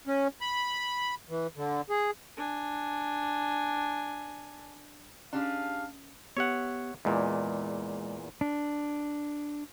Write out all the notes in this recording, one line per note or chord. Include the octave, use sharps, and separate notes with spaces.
C#4
B5
E3
D3
G#4
D4 G#5
C#4 D4 G4 G#4 F5
B3 G4 C#5 E5 F#5
E2 A#2 G#3 D#5
D4